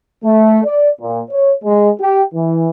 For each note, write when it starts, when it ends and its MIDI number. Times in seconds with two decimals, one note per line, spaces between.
0.24 0.59 57
0.64 0.90 74
1.01 1.21 46
1.30 1.53 73
1.64 1.90 56
2.00 2.23 67
2.35 2.69 52